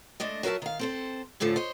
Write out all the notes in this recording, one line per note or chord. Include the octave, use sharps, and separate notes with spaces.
G#3 A3 D4 D#5
F#3 F#4 A#4 E5 A5
D#3 F5
C4 A4 C5
A2 D3 F3 A3 C#4
C5 C#5 D#5